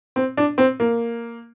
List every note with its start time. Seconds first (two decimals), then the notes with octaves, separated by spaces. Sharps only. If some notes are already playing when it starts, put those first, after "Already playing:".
0.16 C4
0.37 D4
0.58 C4
0.80 A#3